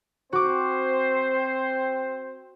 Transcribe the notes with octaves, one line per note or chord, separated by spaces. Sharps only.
C4 F#4 C5 D6